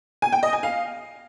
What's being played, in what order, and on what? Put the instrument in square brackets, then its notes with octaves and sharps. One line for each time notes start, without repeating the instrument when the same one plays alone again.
[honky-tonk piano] G#5
G5
D#5
G#5
F5